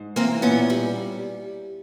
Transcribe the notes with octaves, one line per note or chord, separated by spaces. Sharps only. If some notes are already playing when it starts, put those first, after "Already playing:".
Already playing: G#2
E3 A#3 C4
A#2 B3 C#4
G3